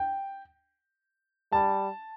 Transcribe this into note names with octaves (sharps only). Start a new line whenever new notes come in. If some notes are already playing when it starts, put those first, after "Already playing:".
Already playing: G5
G3 A5